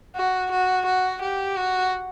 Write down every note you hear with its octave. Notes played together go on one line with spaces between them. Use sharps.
F#4
F#4
F#4
G4
F#4